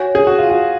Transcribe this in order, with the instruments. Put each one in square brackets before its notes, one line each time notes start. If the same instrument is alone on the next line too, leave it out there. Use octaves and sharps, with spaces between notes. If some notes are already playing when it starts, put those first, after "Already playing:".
Already playing: [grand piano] F#4 [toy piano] C#5 G#5
[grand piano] G#4
F#4
F4
F#4